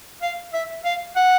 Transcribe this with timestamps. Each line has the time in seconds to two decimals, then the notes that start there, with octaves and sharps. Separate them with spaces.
0.22 F5
0.53 E5
0.85 F5
1.16 F#5